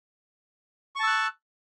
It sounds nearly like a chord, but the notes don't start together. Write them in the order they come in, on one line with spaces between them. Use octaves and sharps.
C#6 A5 E6 F#6